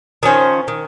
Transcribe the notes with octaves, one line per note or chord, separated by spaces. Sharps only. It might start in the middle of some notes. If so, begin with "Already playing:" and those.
D#3 F3 C#4 C5
D#3